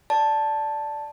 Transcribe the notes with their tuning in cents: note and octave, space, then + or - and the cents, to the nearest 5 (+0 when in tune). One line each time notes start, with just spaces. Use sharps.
D5 +0 A5 +0